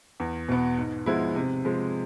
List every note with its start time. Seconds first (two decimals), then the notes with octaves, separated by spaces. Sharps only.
0.20 E2
0.49 B2 B3
0.77 G#2
1.06 F3 G#3 B3 E4
1.36 C3
1.65 F3 G#3